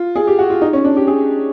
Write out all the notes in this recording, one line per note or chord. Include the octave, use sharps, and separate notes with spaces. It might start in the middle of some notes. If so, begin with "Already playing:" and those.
Already playing: F4
G#4
G4
F#4
F4
D#4
C#4
D4
G4
G#4